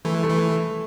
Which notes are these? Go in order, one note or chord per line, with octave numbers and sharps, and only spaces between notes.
E3 A3
A3
E3